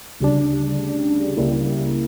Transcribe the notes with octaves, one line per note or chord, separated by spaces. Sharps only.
D2 C#3 G3 D4
C#2 C#3 G3 A#3 E4